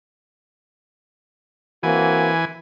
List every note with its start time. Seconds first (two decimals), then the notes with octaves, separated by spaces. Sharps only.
1.83 E3 A#3 C4 F#4 G#5